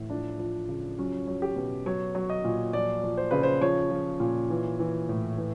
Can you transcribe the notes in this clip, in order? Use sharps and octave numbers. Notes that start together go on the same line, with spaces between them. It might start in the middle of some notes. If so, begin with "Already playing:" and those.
Already playing: A2 E3
F3 D4
F3
C#3
F#3 C#4
F#3
G4
B2
F#3 C#5
F#3
D#5
A#2
F3 D5
F3
C5
C#3 B4
C5
F3 C#5
F3
A#2
E3
E3
A2
E3